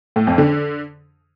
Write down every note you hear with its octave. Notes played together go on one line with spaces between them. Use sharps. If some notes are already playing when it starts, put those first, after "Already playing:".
A2
F2
D3